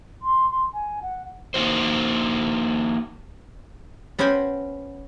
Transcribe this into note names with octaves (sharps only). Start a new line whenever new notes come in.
C6
C6
G#5
F#5
A#3 D#4 F#4 C5
B3 C#4 F#4 C5 G5 G#5